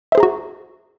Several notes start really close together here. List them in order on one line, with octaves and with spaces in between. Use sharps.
E5 C5 G#4 A#5 F#4